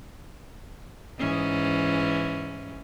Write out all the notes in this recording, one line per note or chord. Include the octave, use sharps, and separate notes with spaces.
G#2 E3 C#4